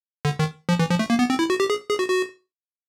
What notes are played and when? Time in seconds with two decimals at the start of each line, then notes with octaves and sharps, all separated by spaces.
0.25 D3
0.39 D#3
0.69 F3
0.79 E3
0.90 F3
0.99 A3
1.10 A#3
1.19 B3
1.30 C4
1.39 E4
1.50 F#4
1.60 G4
1.70 G#4
1.90 G#4
1.99 F#4
2.10 F#4